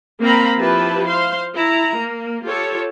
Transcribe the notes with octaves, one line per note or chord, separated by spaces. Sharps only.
A#3 C4 F5 A#5 B5
F3 E4 F4 G4 B4 A5
C5 F5 C6
E4 A#5
A#3
F4 G4 A4 C#5